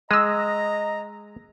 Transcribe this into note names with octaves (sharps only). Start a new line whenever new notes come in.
G#3 D#5 A#5 D#6 E6